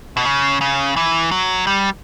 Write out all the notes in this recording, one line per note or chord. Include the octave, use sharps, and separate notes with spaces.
B2
C#3
C#3
E3
F#3
G3